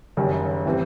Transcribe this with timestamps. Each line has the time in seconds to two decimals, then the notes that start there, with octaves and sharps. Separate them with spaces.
0.17 F#1 F#2 D#3 G3
0.66 A2 E3 G3 C4